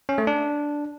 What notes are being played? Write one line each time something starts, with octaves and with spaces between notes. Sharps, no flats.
C#4
A3
D4